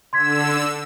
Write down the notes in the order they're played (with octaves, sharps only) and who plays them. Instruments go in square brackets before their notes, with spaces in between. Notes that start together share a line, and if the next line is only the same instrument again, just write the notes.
[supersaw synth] D3 E6 [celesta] C6 G#6 B6